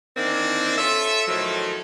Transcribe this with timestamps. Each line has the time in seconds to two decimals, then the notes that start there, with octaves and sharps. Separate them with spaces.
0.17 D#3 E3 A#3 C4 D4
0.77 F4 A4 C#5 E5
1.28 A2 D#3 F3 F#3 A3